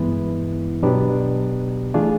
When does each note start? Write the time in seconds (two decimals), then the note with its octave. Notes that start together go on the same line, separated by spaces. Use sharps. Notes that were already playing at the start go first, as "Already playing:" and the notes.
Already playing: G2 E3 G#3 B3 E4
0.82 B2 F#3 B3 D4 G4
1.94 E3 A3 D4 F4 G#4